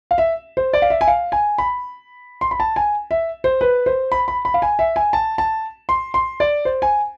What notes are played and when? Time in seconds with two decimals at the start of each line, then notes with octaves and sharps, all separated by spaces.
0.11 F5
0.18 E5
0.57 C5
0.73 D5
0.82 F5
0.90 E5
1.01 G#5
1.08 F5
1.32 G#5
1.58 B5
2.41 C6
2.51 B5
2.60 A5
2.76 G#5
3.11 E5
3.44 C5
3.61 B4
3.86 C5
4.12 B5
4.28 B5
4.45 B5
4.54 F5
4.62 G#5
4.79 E5
4.96 G#5
5.13 A5
5.38 A5
5.89 C6
6.14 C6
6.40 D5
6.65 C5
6.82 G#5